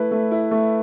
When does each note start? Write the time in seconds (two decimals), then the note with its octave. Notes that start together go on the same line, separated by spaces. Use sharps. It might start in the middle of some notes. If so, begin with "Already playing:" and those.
Already playing: A3 E4 B4
0.11 A3
0.31 E4
0.51 A3